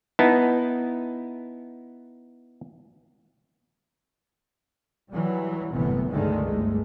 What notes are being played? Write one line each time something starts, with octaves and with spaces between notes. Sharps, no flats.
B3 D#4 E4 A5
E3 F#3 G3
G1 F#2 A2 C3 E3 B3
C#2 G2 D3 D#3 G#3 A3
G1 G2 G#3 A3